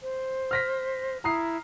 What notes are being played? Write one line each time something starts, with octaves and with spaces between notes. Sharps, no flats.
C5
F6 A#6 B6
E4 A#5 D#6 C7